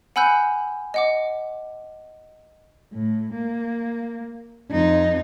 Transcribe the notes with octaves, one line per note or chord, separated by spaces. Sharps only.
F#5 G#5 B5 E6 F#6 G6
D#5 F#5 D6
A2
A#3
F2 D#4